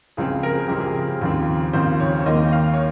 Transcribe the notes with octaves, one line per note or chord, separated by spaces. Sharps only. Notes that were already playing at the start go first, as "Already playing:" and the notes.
C#2 C#3 F3 C4 G#4
A#4
G#4
C#2 C#3 F3 C4 G4
G#4
D#2 C#3 F3 C4
D#2 C#3 F3 C4 C5
C#5
C#5
D#2 D#3 A#3 D#5
F5
C#5